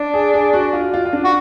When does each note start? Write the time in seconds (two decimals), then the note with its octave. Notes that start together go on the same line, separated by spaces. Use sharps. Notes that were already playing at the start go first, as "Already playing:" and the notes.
Already playing: D4
0.14 G#4
0.34 G#4
0.53 F#4
0.73 F4
0.94 F4
1.05 F4
1.13 D4
1.24 F#4